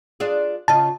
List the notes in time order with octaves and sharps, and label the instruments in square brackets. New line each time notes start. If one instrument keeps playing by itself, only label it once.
[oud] D4 F4 G#4
[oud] C#3 F4 D#5 [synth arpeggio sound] A5